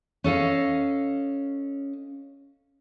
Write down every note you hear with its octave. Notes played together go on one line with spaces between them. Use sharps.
C#4 A4 D#5 F5